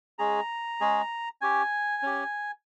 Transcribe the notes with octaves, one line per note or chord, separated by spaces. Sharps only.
G#3 C#4 G#4 A#5
G#3 C#4 G#4
C#4 G4 G#5
C#4 G4